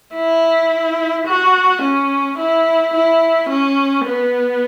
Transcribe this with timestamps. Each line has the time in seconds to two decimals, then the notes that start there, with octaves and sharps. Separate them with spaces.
0.15 E4
1.27 F#4
1.82 C#4
2.39 E4
2.93 E4
3.49 C#4
4.05 B3